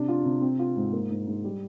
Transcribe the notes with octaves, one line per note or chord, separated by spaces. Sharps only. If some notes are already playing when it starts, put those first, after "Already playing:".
Already playing: C3 D4
F4
C3
C4
F4
G#2
A#3
G#2
G#2
G3